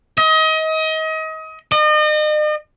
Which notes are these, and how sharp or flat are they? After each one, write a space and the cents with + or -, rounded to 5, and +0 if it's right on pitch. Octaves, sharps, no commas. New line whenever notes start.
D#5 +30
D#5 -40